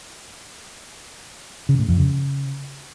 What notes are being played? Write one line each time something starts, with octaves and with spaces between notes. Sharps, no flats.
C#3
A2
F2
C#3